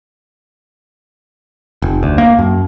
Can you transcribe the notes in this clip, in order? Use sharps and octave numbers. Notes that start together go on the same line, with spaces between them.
F1
D2
A#3
F#2